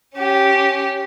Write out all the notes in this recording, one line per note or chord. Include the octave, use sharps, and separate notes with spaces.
C#4 G4